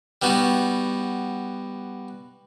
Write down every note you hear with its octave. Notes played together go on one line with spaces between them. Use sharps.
G3 B3 D#4 F#4